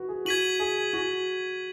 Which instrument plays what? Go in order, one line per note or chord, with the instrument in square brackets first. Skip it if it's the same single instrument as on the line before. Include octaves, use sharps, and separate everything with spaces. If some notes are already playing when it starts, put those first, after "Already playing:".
Already playing: [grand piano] F#4 B4
G#4
[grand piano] F#4 [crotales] G#6 B6 D#7 F#7
[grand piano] G#4
F#4